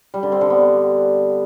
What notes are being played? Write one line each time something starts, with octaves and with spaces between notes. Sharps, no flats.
G3
D3
C4
D3
B3